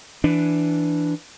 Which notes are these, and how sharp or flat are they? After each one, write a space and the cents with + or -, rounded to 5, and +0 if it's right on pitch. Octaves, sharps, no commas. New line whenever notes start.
E3 +10 D4 +0